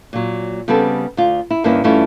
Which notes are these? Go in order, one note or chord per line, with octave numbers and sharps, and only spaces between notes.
A#2 F#3
C#3 G3 B3 C4 A4
D2 F4
E4
G2 D#3 A#3 C#4 E4
G2 E3 A3 C#4 E4 F4